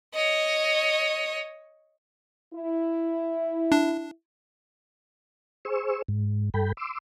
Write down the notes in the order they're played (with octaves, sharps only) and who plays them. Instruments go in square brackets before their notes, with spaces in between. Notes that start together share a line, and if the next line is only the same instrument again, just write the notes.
[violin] C#5 D#5
[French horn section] E4
[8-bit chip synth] D4
[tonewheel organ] G#4 C5 C#6 E6
G#2
G2 A4 G5 B5
C6 D6 E6